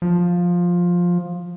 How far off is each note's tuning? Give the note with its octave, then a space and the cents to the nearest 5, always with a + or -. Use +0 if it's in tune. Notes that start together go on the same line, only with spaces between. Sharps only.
F3 +10